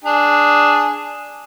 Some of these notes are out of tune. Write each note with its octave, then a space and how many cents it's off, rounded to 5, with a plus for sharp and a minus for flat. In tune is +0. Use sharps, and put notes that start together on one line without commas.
D4 +0 G#4 +0